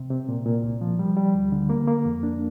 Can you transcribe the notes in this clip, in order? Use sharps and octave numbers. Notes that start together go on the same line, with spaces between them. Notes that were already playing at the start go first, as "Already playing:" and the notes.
Already playing: C3
C3
A#2
A#2
C2
F3
G3
G3
D2
D3
A#3
A#3
F2
D4